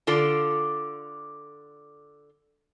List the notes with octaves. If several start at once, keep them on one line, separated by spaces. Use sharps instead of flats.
D3 F4 A4 D5